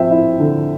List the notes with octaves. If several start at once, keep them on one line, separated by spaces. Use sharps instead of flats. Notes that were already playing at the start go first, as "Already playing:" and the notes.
Already playing: F3 C4 E5 G5
E4
D3